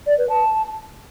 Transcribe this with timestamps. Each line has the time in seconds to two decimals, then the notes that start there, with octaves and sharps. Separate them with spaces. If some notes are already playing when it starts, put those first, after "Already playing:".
0.06 D5
0.18 B4
0.29 A5